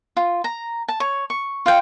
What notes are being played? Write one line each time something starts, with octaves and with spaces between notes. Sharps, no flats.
F4
A#5
A5
C#5
C#6
F4 F5 G5